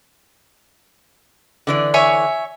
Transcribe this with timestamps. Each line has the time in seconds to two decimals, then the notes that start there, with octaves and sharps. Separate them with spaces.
1.67 D3 E3 D5
1.94 C#5 E5 G#5